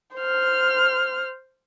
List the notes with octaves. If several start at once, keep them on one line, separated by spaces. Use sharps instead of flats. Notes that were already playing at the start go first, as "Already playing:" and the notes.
C5 F6